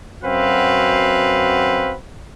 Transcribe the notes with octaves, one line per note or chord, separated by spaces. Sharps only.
F#2 C4 F#4 B4 F5